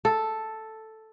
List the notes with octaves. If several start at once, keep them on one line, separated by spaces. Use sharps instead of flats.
A4